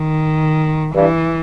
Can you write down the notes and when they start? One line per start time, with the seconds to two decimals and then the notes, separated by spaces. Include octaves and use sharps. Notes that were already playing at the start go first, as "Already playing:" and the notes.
Already playing: D#3
0.95 G2 E3